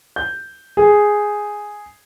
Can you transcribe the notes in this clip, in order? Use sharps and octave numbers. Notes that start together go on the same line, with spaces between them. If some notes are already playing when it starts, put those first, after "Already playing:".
G6
G#4